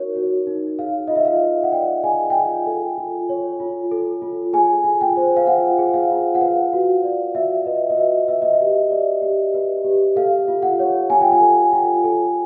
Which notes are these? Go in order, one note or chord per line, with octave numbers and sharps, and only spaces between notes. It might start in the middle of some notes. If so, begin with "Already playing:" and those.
Already playing: D#4 F#4 A#4 C#5
F#4
D#4
G#4 F5
F4 D#5
E5
F5
B4
F#5
D5 G5
G#4 G#5
G5
F4 G#5
A4
F4
C#5
F4
A4
F4
G#4 G#5
F4
G5
C5
F5
F4 F#5
G#4
F5
F4
F#5
B4 F5
F#4
D5
F#4 E5
B4 D#5
D#5
F#4 E5
B4 E5
D#5
E5
G4
D5
G4
B4
G4
A4 F5
F4
F#5
C#5
F4 G#5
G5
G#5
A4
F4
A4